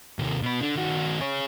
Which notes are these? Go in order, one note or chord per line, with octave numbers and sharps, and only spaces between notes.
D#2 C3
B2 B4
D3
D#3 F#4
G#4 C#5